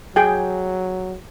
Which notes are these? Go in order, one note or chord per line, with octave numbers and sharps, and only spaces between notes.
F#3 G#4 G5